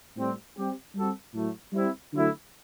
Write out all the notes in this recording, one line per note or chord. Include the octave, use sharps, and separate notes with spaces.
A2 G3 C4
G3 C4 G4
G3 C4 F#4 A4
A2 F#3 A3
G3 C4 E4
D3 F#3 A3 E4